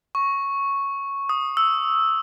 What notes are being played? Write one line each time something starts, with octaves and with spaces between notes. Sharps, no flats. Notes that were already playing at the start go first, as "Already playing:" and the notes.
C#6
D#6
E6